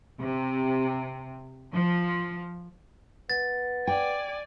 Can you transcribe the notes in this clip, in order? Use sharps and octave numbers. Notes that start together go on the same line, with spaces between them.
C3
F3
B3 A6
D5 G5 G#5